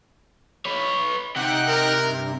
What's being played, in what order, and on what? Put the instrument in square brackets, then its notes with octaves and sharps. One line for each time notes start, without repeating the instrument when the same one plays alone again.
[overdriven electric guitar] B4 C#5
[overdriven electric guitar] C3 [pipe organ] D#4 G5 F#6 [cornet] F#5
[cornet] A#4
[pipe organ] G2